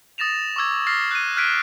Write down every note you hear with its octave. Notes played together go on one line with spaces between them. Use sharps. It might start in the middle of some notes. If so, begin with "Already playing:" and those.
D#6 A6 A#6 E7 F7
C#6 D6 E6 G#6
F6 A6 A#6 C7
F#6 D#7
F6 F#6 G#6 B6 D7 D#7